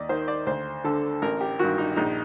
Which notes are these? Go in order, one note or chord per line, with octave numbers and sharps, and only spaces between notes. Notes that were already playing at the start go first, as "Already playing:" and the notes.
Already playing: D#2 D5 D#5
D#3 C5
D5
D2 C5
D3 A4
A1 A#4
G4
G2 D#3 F#4
D#4
A#1 D#4